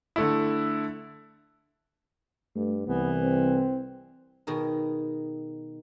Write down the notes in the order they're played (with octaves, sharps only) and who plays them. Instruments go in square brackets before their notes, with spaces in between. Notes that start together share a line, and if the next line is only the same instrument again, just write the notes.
[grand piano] D3 A3 E4
[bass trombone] G2 [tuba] A3
[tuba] C2 [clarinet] E3 [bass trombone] B3
[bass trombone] C4
[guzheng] B2 D#3 G#4 A#4